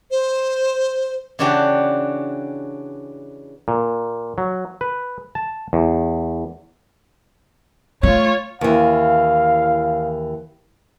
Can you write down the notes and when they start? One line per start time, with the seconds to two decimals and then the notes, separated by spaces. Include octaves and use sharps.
0.11 C5
1.39 C#3 E3 D4 F#4 G4
3.68 A#2
4.38 F#3
4.81 B4
5.35 A5
5.73 E2
8.03 A3 F4 C#5
8.61 D#2 E3 F5